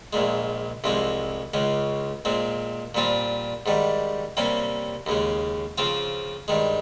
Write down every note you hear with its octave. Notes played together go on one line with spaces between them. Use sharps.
A#1 A#2 G#3
C2 C3 F3 G#3
C#2 C#3 G#3
A#2 G#3 C4
A#2 G3 C4 F4
G#2 D#3 G3
C3 G3 A#3 C#4
D#2 C#3 G#3
C#3 F3 C4 F4
G2 D#3 G#3